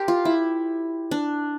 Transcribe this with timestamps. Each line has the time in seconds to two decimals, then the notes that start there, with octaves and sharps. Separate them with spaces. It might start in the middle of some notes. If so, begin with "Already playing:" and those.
Already playing: G4 A#4 C5
0.08 F4
0.25 E4
1.11 D4